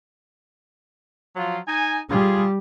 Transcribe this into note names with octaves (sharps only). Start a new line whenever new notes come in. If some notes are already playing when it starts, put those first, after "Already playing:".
F3 F#3 F4
D#4 G#5
G3 F4 G#4